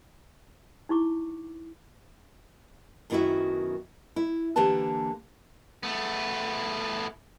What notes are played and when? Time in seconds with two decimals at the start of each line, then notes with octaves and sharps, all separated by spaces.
0.89 D#4 E4 C#6 D6
3.10 F#2 D#3 B3 E4 F#4 E5
4.16 E4
4.56 D3 E3 A#3 G4 B4 A5
5.83 A3 B3